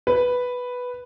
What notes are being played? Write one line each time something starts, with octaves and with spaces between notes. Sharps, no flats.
B4